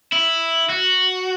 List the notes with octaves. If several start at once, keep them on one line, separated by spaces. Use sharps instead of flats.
E4
F#4